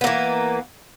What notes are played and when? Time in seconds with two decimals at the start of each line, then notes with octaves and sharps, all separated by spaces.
0.01 B3
0.04 A#3
0.07 E3